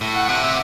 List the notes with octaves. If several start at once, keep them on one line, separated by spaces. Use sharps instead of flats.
A2
F#5
C3 F#5
E5